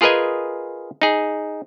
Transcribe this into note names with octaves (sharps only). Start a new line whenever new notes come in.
F4 G#4 A#4 B4 D#5 G#5
D#4 G#4